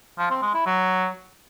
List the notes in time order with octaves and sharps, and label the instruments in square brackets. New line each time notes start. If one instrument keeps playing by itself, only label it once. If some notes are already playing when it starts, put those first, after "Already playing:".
[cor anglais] F3
C4
G#3
E4
F#3